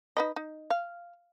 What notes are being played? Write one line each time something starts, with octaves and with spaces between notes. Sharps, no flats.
D#4 B4 D#5
D#4
F5